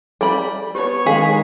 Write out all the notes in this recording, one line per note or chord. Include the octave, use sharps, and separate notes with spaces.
G3 G#4 B5
B3 G4 C#5
D#3 G#3 G#4 F5